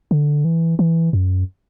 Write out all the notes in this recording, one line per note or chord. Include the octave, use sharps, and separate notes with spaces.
D3
E3
E3
F#2